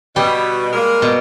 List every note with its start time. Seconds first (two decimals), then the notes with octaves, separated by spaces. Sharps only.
0.16 B2 G3 G4
0.73 G#3 A#3 A#4
1.02 B2